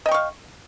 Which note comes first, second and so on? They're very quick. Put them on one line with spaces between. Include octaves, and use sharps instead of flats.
D#5 G5 C#6 F5